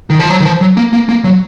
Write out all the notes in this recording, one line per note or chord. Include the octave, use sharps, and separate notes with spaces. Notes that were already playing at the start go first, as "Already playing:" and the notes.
D#3
F3
F#3
D#3
F3
F#3
A#3
A#3
A#3
F#3